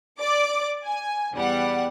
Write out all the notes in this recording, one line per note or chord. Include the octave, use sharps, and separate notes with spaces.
D5 D6
G#5
E2 G3 F#5